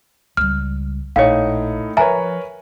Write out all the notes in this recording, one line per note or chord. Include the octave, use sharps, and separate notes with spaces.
C#2 G3 F6
A#1 A2 D#4 C#5 F5 C#7
F3 A#4 B4 C#5 E5 G#5 A#5